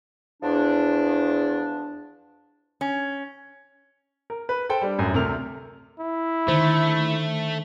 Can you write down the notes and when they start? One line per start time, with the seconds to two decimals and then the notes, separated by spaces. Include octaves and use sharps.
0.43 E2 F3 D4
2.81 C#4
4.30 A#4
4.49 B4
4.69 A4 C5 G5
4.82 G3 D4
4.98 A1 F#2
5.14 D2 C3 A3 A#4 F6 F7
5.99 E4
6.48 D3 D#3 A3 C5